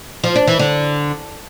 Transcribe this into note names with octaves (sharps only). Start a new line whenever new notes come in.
F3
D4
E3
D3